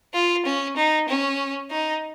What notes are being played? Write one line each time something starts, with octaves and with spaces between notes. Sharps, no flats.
F4
C#4
D#4
C#4
D#4